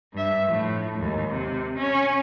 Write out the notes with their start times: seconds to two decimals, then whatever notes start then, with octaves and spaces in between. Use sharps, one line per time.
0.13 G2 E5
0.46 A2 F3
0.99 D#2 G#2
1.29 C3
1.78 C#4